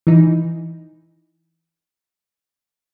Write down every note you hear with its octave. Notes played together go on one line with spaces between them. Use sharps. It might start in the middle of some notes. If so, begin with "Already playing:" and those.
E3 D#4